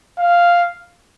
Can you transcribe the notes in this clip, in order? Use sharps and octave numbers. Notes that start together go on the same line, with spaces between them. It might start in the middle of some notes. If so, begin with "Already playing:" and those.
F5